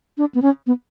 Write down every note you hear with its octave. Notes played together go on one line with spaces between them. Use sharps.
D4
B3
C#4
B3